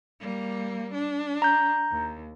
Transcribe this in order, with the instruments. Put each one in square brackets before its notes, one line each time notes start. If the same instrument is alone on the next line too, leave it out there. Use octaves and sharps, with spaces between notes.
[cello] G3 A#3
D4
[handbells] A#5 G6
[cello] D#2